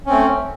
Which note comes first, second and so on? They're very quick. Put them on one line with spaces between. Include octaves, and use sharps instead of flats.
C#4 C4 A3